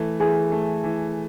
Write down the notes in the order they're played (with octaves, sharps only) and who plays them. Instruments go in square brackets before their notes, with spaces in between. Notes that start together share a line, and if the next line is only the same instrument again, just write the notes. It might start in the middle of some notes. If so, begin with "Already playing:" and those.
Already playing: [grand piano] E3 A3 [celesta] A4
[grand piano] E3 [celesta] G#4 G#5
[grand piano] A3
E3